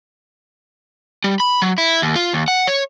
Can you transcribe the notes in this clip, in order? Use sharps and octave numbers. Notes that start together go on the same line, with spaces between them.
G3
B5
F#3
E4
D#2
F4
D#2
F#5
C#5